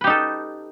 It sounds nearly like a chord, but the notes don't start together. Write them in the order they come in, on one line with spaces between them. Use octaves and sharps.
B4 G4 D#4 A4